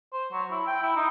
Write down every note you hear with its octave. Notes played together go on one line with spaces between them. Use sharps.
C5
F#3
E4
G5
E4
D#4